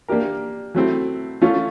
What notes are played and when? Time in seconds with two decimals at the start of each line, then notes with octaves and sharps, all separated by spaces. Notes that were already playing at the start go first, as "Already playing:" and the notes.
0.08 A#3 D4 G4 A#4
0.75 F#3 A3 C4 E4
1.42 A3 C#4 F4